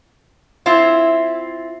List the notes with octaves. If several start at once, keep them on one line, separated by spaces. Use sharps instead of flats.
C4 E4 F4